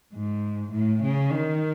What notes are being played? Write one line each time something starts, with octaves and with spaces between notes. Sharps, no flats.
G#2
A2
C#3
D#3